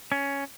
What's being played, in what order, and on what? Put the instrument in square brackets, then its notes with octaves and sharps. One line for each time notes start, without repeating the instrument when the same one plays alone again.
[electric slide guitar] C#4